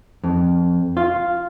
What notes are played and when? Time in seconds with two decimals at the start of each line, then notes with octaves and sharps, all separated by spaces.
0.24 F2
0.97 F4